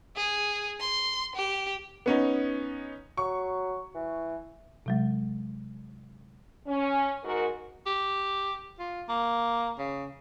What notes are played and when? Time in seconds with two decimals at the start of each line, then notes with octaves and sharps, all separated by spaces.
0.17 G#4
0.80 C6
1.36 G4
2.06 B3 C#4 D#4
3.17 F#3 C#6
3.94 E3
4.86 C3 F#3 G#3
6.67 C#4
7.23 G#2 F#4 A#4
7.86 G4
8.79 F4
9.08 A#3
9.78 C#3